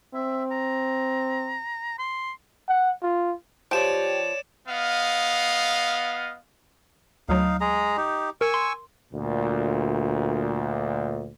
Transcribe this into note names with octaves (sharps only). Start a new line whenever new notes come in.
C4 E5
A#5
C6
F#5
F4
F3 G4 C#5 D5 G5 D7 E7
B3 D#5 F5
D2 F#3 D#4 F5
G#3 G#4 A#5
D#4 G4
A#4 G#5 C#6 E6
C6
D2 A#2